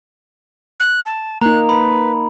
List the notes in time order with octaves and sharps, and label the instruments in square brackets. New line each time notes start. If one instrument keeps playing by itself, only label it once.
[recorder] F#6
A5
[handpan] A#3 D#4 [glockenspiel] A#5 [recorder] F#6
[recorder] B4 [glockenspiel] B5